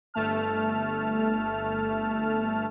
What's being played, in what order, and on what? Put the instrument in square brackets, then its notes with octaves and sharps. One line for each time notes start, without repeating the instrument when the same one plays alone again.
[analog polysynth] G1 A3 A5 F6